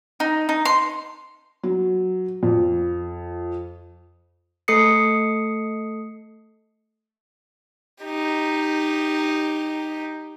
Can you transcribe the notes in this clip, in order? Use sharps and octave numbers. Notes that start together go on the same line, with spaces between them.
D#4
D#4
C6
F#3
F2
A3 A4 D#6 C7 C#7
D#4 G4